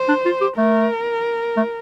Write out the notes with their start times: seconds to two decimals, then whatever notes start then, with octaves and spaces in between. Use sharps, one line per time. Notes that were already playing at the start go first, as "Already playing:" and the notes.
Already playing: C5
0.08 D4
0.25 F4
0.41 G4
0.58 A3 A#4
1.57 A3